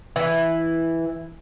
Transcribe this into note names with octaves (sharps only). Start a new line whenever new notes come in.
E3